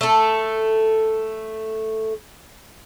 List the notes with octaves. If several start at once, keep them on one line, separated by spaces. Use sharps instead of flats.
A3 A4